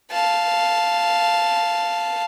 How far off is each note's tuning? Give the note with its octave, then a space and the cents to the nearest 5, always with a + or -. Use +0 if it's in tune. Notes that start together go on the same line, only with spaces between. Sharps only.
F5 -5 A5 +0